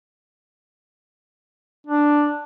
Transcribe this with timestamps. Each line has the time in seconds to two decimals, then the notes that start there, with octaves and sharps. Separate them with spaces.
1.87 D4